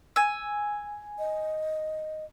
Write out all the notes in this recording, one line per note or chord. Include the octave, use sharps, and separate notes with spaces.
G#5 E6
D#5